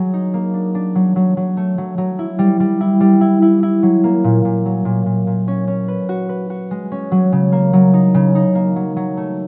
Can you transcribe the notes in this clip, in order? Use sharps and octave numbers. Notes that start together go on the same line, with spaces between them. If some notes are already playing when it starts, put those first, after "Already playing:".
Already playing: F#3 G#4
D#4
A#3
D4
D4
F#3
F#3
F#3
A3
F#3
F#3
E4
G3
G3
E4
G3
E4
E4
E4
F#3
A#3
A#2
A#2
F#3
A#2
A#2
A#2
C#4
C#4
B4
F#4
B4
F#4
G#3
C#4
F#3
C#3
A#3
F#3
D#4
C#3
D#4
A#3
F#3
F#3
A3